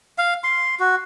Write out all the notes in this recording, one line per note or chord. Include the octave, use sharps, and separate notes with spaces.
F5
C6
F#4